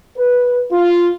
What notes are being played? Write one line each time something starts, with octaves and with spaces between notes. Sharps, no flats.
B4
F4